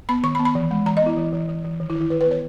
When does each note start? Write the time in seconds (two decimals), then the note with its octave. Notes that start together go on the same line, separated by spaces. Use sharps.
0.09 B3 B5
0.24 D#3 C#6
0.35 B5
0.40 B3
0.45 B5
0.55 E3
0.71 G#3
0.86 E3 A#5
0.97 D#5
1.02 B3 E4
1.17 E3
1.33 E3
1.48 E3
1.64 E3
1.80 D#3
1.90 E4
1.95 D#3
2.01 E4
2.10 D#3 B4
2.21 B4
2.26 B3
2.31 C#5